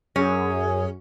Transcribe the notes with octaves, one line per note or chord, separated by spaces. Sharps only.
F#2 C#4 G#4